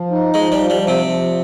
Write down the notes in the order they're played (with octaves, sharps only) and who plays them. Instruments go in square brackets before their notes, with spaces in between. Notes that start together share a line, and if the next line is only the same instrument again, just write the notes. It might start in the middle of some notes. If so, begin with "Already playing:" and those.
Already playing: [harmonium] F3
D#4
[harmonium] F3 [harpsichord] G#3
[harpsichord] G3
[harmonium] F3
[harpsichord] G3
[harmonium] F3
[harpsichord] C3
[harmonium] F3